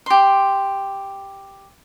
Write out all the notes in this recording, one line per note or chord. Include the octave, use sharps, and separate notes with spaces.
G4 C6